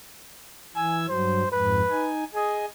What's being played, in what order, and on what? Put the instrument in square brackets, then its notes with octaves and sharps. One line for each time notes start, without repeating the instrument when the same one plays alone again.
[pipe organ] E3 E6 G#6 [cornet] G#5
[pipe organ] G2 F#3 [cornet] C5
[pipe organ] F2 G#2 [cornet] B4
[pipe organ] D#4 G#5
[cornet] G#4 [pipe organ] D#5 G#5